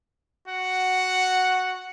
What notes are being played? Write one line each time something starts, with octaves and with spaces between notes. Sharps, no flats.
F#4 F#5